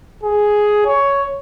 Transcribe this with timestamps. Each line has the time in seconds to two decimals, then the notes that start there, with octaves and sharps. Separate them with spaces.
0.23 G#4
0.86 C#5